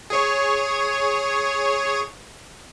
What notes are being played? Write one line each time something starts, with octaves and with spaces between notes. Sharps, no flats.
G#4 C#5